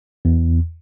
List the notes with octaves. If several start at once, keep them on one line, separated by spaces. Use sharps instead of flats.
E2